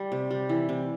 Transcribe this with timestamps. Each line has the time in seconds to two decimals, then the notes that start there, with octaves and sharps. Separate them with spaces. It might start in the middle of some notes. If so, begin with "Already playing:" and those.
Already playing: G3
0.12 C3
0.31 G3
0.49 E3
0.69 C3